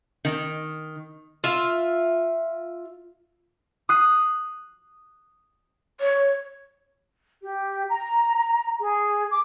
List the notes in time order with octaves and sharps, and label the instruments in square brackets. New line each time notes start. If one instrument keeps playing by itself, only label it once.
[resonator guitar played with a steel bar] D#3
[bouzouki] F4 E5
[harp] D#6 F#6 C7
[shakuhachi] C#5
[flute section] G4
A#5
G#4
D6